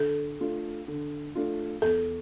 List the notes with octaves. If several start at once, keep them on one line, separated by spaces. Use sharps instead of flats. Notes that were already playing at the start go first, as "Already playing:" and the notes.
Already playing: D3 A4
A3 D4 F4
D3
A3 D4 F4
E2 A4